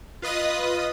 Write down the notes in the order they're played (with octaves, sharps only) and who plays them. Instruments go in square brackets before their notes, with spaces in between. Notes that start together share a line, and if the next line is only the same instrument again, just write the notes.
[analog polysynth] F4 B4 D#5 D#6